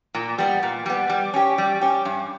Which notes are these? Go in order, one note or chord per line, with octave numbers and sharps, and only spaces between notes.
A#2
G3 B3
A#2
G3 B3
G3
C#4 G4
G3
C#4 G4
G2